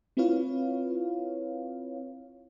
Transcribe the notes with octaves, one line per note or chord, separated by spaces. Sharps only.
C4 E4 F4 B4 C#5 F5